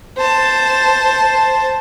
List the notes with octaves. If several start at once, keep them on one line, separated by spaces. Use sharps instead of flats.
C5 A5